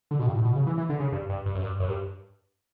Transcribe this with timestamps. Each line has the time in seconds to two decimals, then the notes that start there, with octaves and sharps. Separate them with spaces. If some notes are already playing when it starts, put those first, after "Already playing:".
0.11 D3
0.19 B2
0.27 G2
0.35 A2
0.44 B2
0.55 C#3
0.67 E3
0.78 E3
0.89 D3
1.00 C#3
1.12 G2
1.29 G2
1.46 G2
1.55 F#2
1.62 G2
1.80 F#2
1.88 G2